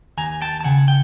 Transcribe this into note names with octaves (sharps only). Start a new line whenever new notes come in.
D#2 G#5 A#5
G5 A5
A5
C#3 F#5 G#5
G5